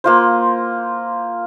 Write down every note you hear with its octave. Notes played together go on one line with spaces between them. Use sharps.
A#3 F4 C5